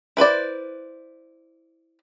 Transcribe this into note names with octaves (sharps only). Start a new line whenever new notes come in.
E4 B4 C5 D5